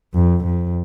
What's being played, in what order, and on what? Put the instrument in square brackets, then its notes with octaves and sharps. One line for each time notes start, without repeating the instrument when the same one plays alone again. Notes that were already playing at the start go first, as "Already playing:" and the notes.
[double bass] F2
F2